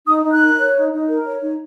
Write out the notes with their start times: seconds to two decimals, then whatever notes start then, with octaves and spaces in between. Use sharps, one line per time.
0.06 D#4 D#6
0.23 D#4
0.32 F#6
0.40 A#4
0.57 C#5
0.74 D#4
0.91 D#4
1.08 A#4
1.25 C#5
1.42 D#4